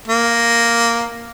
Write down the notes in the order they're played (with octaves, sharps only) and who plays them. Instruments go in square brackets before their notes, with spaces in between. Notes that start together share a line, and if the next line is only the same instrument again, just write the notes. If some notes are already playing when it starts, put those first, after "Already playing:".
[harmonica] A#3